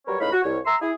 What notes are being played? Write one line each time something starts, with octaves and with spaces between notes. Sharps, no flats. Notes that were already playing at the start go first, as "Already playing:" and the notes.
F#3 G3 A#4 B4 C#5
C#2 A2 D#4 C#5 F5 B5
F#4
C2 C#5
E5 A#5 C6 E6
E4 G#4